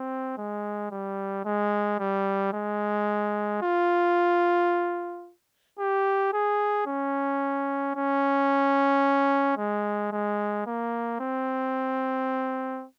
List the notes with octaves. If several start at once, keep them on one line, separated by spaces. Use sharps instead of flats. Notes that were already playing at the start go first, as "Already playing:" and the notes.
Already playing: C4
G#3
G3
G#3
G3
G#3
F4
G4
G#4
C#4
C#4
G#3
G#3
A#3
C4